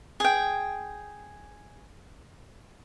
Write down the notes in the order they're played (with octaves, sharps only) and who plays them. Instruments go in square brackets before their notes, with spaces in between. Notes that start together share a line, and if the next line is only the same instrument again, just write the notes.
[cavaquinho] G#4 G5